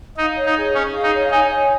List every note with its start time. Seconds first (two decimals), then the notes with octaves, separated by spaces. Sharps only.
0.17 D#4 F5
0.36 C#5
0.46 D#4
0.55 G#4
0.74 C#4 G#4
0.93 F5
1.03 D#4
1.13 C#5
1.31 D#4 G#5
1.50 C#5